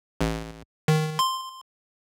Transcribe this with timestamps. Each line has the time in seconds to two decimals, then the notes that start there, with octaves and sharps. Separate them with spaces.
0.21 A1
0.88 D#3
1.19 C6